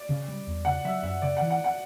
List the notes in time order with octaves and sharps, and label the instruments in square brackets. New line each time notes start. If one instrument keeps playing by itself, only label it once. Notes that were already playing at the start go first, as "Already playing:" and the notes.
Already playing: [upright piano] D5
[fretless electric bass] C#3
G3
E2
[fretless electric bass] C#3 [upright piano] F#5
[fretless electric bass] F#3 [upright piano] E5
[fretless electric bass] F#2 [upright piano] E5
[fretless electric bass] C#3 [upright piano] D5
[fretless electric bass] E3 [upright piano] F#5
[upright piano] F#5
F#5